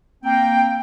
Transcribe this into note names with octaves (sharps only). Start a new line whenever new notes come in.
A#3 C4 G5